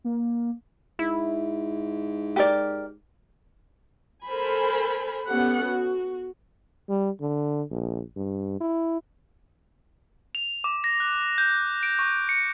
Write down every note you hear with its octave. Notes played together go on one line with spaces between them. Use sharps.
A#3
G#2 E4
G4 A#4 D5
A4 A#4 C5 G#5 B5
B3 C#4 G4 A4 F#5
F#4
G3
D3
A#1
G2
E4
F7
D6
A#6
F#6
G6
D7
C#6
C#7